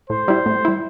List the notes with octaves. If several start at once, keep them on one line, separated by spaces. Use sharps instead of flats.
A2 C5
G3 E4
A2
G3 E4